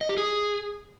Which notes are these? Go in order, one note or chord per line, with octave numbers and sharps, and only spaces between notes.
D#5
G4
G#4